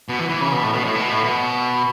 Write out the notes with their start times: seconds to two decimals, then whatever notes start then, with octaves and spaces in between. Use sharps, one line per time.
0.09 B2
0.19 E3
0.29 E3
0.41 C#3
0.52 B2
0.62 A2
0.73 B2
0.85 A2
0.95 B2
1.10 A2
1.24 B2